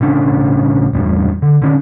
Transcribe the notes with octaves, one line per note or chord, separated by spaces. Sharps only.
A1 C#3 D4
A1 E2 G2
D3
D3 D#3 C#4